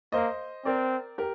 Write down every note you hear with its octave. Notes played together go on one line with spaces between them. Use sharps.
A#3 C5 D#5
C4 A#4 D5
G4 A#4